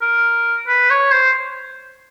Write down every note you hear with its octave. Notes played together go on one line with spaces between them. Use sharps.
A#4
B4
C#5
C5